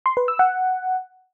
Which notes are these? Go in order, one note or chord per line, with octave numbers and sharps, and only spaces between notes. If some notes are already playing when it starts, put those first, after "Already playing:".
C6
B4
E6
F#5